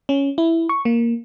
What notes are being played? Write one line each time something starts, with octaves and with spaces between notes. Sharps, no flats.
C#4
E4
C#6
A#3